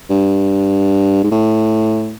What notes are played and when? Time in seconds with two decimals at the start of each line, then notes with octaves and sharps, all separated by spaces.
0.10 G2
1.23 G#2
1.31 A2